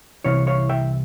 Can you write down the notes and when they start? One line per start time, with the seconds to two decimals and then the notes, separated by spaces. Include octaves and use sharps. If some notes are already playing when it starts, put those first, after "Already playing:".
0.24 C2 C3 E3 C#5 F5
0.47 C#5 F5
0.69 E5 G5